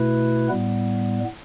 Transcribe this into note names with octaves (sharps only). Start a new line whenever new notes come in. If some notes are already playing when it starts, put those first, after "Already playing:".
Already playing: B2 A3 E4 B4
A2 G3 B3